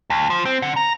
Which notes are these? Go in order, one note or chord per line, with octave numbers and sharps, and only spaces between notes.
D2
F3
C4
D3
A#5